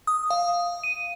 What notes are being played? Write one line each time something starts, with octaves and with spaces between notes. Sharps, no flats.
D#6
F5
D#7